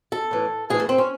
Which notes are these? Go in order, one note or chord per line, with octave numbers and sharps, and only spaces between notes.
A4
A2 E3
A2 E3 G#4
A3
C4
C#4